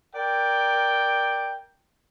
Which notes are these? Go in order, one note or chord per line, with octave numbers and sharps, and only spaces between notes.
A#4 D5 G5